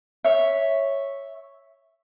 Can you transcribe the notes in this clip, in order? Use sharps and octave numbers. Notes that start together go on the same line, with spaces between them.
C#5 E5